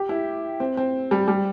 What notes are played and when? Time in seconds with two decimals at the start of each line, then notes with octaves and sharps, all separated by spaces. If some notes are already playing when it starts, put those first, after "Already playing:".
Already playing: G4
0.09 E4
0.60 C4
0.77 C4
1.11 G3
1.28 G3